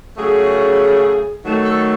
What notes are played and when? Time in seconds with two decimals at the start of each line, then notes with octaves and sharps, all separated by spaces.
0.17 C#3 F#3 A3 G#4
1.44 D#3 F#3 A3
1.64 A4